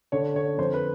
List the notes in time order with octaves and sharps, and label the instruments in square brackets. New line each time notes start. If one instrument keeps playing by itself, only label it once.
[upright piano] D3 C#5
D3 C#5
F2 C5
B4